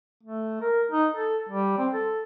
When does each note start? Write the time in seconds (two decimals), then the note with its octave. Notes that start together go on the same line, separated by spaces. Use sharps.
0.23 A3
0.61 A#4
0.91 D#4
1.13 A4
1.49 G3
1.78 C4
1.93 A4